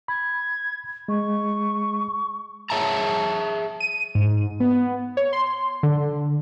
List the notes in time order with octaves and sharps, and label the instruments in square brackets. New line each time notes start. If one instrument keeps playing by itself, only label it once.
[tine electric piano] B5 [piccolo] G#6
[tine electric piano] G#3 [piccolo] C#6
[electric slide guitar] G#4 C#5 E5 A5 A#5
[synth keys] D#7
G#2
B3
C#5
C6
D3